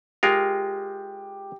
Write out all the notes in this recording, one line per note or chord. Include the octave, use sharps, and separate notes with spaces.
G#3 F4 G4 A#4